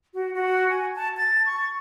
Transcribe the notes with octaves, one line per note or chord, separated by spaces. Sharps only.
F#4
F#4
G#5
A5
A6
C#6